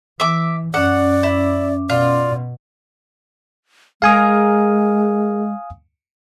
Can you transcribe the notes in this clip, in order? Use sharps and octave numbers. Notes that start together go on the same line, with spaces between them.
E3 E5 D6
F#2 C#4 D5 F#5 D6
E4
B2 F4 D5
G#3 G#4 A#4 F5 G#5 D#6